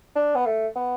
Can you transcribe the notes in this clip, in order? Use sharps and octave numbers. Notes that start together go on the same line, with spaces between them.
D4
B3
A3
B3